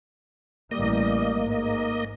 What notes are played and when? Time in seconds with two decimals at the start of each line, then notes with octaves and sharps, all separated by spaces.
0.71 A1 G3 A#3 D#5
1.40 G#2